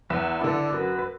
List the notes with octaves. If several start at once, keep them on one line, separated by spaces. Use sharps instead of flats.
E2 B4 E5
D3 B3 E4 A4 D5
F#2 F#4 B4
B4